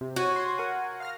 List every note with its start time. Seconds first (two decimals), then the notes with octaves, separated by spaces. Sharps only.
0.01 C3
0.16 F#4 C#5 D#7
0.36 C6 G#6
0.58 A#4 F#5 G#5
1.00 F5 F6 A#6